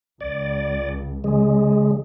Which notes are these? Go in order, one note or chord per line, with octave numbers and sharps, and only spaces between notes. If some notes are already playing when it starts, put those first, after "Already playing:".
C#2 D5
C#3 G#3